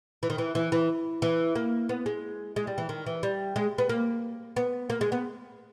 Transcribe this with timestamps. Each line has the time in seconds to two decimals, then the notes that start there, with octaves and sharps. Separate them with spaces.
0.23 E3
0.30 D#3
0.38 E3
0.55 E3
0.72 E3
1.22 E3
1.55 A#3
1.89 B3
2.06 G#3
2.56 G#3
2.67 G3
2.78 E3
2.89 D#3
3.06 E3
3.23 G3
3.56 G#3
3.78 B3
3.89 A#3
4.56 B3
4.90 A#3
5.01 G#3
5.12 B3